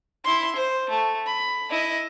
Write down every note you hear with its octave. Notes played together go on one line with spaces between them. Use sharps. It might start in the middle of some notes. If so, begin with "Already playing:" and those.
E4 C6
C5
A3
B5
E4 D#5